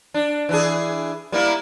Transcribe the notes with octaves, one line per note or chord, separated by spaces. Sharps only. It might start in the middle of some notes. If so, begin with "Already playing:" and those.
D4
E3 D4 G#4
G3 A#3 E4